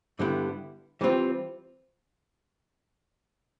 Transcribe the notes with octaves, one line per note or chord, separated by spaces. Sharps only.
G2 D3 G3 B3 E4
E3 G3 C4 F4